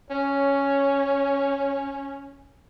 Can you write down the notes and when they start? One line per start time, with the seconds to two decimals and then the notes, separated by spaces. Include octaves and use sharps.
0.10 C#4 C#5